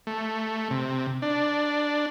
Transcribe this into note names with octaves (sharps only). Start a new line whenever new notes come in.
A3
C3
D4